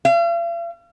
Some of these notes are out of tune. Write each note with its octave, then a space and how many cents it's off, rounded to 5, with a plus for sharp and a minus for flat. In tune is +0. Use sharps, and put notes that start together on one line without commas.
F5 -45